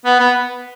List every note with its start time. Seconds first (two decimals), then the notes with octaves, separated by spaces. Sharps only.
0.05 B3
0.20 B3